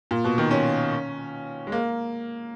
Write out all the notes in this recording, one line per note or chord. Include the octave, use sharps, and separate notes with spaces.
A#2
B2
D#3
C#4
G#3
A#3